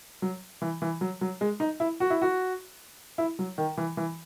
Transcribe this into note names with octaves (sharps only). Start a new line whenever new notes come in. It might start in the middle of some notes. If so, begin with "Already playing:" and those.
F#3
E3
E3
F#3
F#3
G#3
D#4
E4
F#4
E4
F#4
E4
F#3
D#3
E3
E3